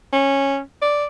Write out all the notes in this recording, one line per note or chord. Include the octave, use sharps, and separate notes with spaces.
C#4
D5